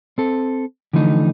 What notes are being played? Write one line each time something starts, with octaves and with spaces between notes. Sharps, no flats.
C4 A4
D3 E3 F3 A3 D#4